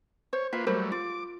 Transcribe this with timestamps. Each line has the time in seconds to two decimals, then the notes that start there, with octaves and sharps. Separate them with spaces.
0.33 C5 C#5
0.53 A#3 F4 B4 E5
0.67 F#3 G3 A3 A#4 C5 B5
0.92 F4 D6